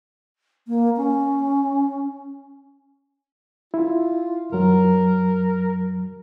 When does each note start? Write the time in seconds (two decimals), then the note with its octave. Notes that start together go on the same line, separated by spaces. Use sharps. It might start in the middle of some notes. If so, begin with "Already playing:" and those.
0.67 A#3
0.96 C#4
3.74 E4 F4
4.52 F#2 F#3 A#4